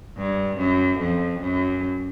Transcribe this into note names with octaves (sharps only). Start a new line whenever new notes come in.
G2
F#2
F2
F#2